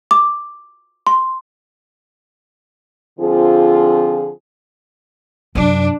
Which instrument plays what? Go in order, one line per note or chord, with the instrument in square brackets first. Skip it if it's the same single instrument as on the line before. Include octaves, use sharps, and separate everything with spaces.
[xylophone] D6
C6
[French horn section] D3 F3 C4 F4 G#4
[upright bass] F#2 C3 [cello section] D4